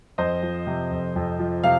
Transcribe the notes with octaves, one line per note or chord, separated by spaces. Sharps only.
F2 C5 D#5
F3
C3
F2
F2
F3
C3 F5